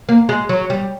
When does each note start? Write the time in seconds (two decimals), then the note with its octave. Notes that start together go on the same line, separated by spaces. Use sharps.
0.09 A#3
0.29 G#3
0.49 F#3
0.70 G3